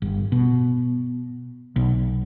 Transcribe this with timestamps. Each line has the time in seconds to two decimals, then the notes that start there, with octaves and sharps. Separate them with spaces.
0.02 G1
0.32 B2
1.76 B1